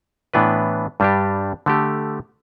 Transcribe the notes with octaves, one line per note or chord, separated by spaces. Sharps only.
A2 E3 B3 D4 B4
G2 G3 D4 G4
D3 A3 G4